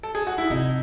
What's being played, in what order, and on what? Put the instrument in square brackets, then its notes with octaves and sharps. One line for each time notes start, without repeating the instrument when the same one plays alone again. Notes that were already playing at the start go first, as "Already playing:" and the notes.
[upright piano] A4
G#4
F#4
E4
[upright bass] C3 [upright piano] D#4